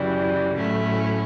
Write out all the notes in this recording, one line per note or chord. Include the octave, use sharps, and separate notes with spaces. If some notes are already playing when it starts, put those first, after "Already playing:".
Already playing: F#2 C#3 E3 G3
A2 F#3 A3 C#4 E4